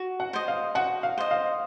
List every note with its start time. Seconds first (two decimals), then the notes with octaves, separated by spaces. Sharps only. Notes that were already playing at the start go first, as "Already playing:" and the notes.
Already playing: F#4
0.20 F#5
0.33 C5 D#5
0.48 F5
0.75 F#4 F#5
1.03 F5
1.18 C5 D#5
1.31 F5